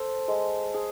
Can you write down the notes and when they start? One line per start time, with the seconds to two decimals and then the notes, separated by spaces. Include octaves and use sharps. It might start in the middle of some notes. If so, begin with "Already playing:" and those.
Already playing: A4 C5
0.28 G#3
0.74 G#4